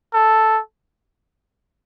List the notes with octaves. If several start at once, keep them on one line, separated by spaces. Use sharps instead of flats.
A4